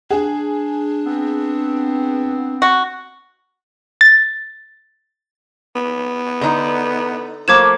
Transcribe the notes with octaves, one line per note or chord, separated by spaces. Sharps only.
D4 G#4
B3 C4
F#4
A6
B3
D3 D#4
F3 A3 A#3 D6 G#6 E7